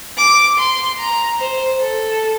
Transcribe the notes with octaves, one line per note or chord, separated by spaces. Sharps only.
D6
C6
A#5
C5
A4